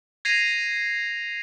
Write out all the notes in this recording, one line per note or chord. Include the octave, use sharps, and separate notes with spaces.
G#6 A#6 C7 D#7 F7